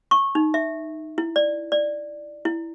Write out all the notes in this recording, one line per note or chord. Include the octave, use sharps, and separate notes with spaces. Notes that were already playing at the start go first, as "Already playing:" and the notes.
C#6
D#4
E5
E4
D5
D5
E4